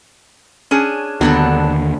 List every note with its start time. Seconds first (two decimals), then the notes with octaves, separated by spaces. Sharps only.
0.71 C#4 D4 G#4
1.21 D#2 D3 F#3 G3 B3 D4 A4